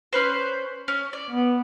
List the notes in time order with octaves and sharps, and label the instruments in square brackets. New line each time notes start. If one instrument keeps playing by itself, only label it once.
[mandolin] C#4 B4 C5
C#4
D5
[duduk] B3